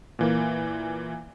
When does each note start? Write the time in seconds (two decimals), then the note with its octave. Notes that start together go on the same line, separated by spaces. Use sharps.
0.19 A#2 E3 A#3